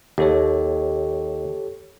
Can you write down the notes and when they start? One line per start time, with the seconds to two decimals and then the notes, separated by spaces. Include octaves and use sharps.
0.18 D#2 G4 A4 C#5